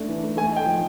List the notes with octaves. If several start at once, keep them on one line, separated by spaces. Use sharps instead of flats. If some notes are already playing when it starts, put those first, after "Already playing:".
Already playing: A3 D4
E3
A3
A3 G#5
D#4 G5
F3